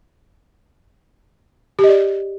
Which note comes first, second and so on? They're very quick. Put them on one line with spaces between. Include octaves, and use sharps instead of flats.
G4 D#5 D5